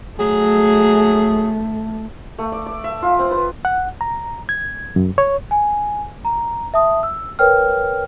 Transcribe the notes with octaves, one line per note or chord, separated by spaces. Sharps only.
F#3 A3 G#4
A3
D5
D5
E5
F4
C4
B4
F#5
A#5
G#6
F#2
C#5
G#5
A#5
E5 A5 D#6
E6
A#4 B4 C#5 G5 F6